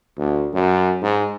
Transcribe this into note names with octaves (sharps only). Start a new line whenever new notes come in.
D2
F#2
G#2